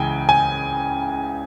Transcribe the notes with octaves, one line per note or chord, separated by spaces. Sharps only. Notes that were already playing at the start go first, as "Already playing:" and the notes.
Already playing: C#2 C#3 E3 G5 G#5
G#5